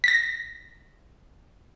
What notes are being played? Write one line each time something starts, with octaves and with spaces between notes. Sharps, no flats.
A#6 B6